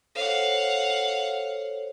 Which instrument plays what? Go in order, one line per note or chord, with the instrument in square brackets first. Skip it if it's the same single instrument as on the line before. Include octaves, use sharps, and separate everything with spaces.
[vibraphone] A4 C5 C#5 [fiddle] F5 F#5